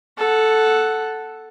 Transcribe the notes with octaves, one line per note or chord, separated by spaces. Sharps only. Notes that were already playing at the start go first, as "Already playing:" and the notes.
A4 F#5